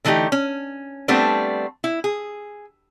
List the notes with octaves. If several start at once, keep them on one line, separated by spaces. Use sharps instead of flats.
D3 E3 A3 D#4 G4
C#4
G3 A3 B3 C4 D4
E4
G#4